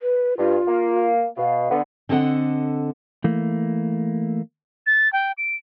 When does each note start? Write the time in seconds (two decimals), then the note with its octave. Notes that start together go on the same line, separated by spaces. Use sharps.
0.01 B4
0.38 G2 F4
0.68 A#3
1.37 B2 F5
1.70 D3 B3
2.09 D3 C4 D4 A4 D#5 F#5
3.24 E3 A3 A#3
4.86 A6
5.13 G5
5.38 D7